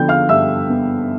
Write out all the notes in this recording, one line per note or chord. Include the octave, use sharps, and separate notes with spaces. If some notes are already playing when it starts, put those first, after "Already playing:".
Already playing: D3 F3 B3 A4 G5 G6
F5 F6
G2 E5 E6
B3